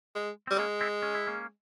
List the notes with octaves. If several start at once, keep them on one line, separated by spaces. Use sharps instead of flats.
G#3
G3 C4
G#3 A#3 C#4
C4 E4
C#4
E4
A#3 C#4